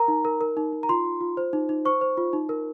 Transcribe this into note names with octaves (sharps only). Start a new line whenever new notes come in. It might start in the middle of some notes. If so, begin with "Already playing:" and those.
Already playing: A#4 A#5
D#4
A#4
A#4
D#4
D#4
A#5
F4 C6
F4
F4
C5
D#4
D#4
C5 C#6
C5
F4
D#4
A#4